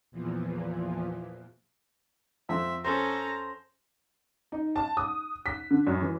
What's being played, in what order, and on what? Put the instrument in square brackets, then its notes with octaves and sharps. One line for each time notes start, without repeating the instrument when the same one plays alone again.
[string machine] E2 A#2 E3 F3
[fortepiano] F2 [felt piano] C4 [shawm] E5
[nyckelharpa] C#4 A4 [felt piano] C5 [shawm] A#5
[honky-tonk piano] D#4
A5
D#6
B6
D3
F#2
E3